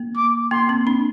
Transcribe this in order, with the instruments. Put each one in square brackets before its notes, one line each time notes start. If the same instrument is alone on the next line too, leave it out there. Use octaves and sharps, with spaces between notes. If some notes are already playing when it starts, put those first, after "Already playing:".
Already playing: [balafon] A#3
[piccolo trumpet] D6
[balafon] A#3 [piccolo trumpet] C6
[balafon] C4
D4